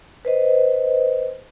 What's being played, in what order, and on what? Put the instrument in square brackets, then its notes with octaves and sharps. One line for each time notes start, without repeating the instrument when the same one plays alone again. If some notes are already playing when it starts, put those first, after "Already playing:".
[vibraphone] B4 C5 D#5